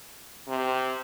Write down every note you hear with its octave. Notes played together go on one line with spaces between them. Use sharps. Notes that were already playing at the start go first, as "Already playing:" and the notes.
C3